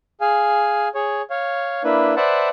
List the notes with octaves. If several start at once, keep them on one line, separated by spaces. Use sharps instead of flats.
G#4 F5 G#5
G#4 C#5
C#5 F5
A#3 D4 E4 B4
B4 C5 D5 E5 F#5 A5